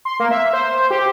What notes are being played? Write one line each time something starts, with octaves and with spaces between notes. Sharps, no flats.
C6
A#3
E5
C5
G4